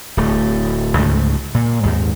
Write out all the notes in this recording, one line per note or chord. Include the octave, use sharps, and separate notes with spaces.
D1 A3
C#2 G#2 A3
A#2
D#2 G#2